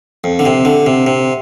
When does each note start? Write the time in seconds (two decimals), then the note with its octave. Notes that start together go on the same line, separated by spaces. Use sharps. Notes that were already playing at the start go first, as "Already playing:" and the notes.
0.24 F2
0.39 D3
0.46 C3
0.65 D3
0.86 C3
1.07 C3